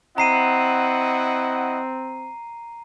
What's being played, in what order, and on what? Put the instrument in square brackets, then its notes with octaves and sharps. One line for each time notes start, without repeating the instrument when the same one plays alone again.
[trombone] C4 [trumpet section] E4 D#5 F#5 [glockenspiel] A#5 C7 D#7